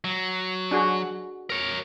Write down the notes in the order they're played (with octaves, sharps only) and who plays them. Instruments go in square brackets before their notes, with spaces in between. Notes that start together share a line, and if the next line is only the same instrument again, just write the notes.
[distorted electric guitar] F#3
[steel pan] D4 F#4 G#4
[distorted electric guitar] A#4 C#5